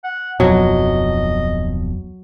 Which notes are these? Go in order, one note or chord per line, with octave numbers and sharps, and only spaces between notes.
F#5
D1 F2 B2 F#3 D#5